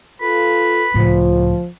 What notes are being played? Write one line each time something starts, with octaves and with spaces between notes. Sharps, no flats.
F4 A4 B4
C#2 A2 F3